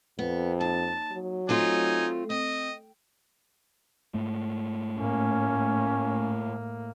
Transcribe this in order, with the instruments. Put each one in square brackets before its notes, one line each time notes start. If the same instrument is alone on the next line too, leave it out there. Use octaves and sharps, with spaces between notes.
[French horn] F2 [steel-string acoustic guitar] B3
[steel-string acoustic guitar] D#2 [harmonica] A5
[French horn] F#3
[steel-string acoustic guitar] A3 C4 F4 [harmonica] D#4 G#5
[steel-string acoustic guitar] C4 [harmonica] D#5
[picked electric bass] G#2 A3
[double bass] A2 A#3 [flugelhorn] C#4